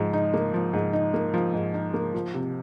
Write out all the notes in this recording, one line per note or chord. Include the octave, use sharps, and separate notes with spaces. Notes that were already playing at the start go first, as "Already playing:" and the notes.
Already playing: G#2 F3
D#4
A#3
F3
G#2
D#4
A#3
F3
G#2
D#4
A#3
F3
C3